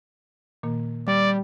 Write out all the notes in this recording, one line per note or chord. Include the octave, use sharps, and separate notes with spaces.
A#2 D#3 A#3
G3 D5